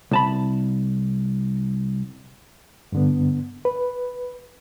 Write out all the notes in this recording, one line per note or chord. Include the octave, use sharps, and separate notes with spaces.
C2 A5 B5
G2 D3 B3
B4